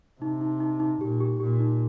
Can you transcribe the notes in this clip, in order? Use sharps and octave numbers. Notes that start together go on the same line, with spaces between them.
C3 D#4
D#4
D#4
D#4
A#2 G4
G4
A#2 G4
D#4